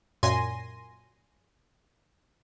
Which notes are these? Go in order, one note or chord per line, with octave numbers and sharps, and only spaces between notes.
F#2 A#2 G#5 C6 A#6 D#7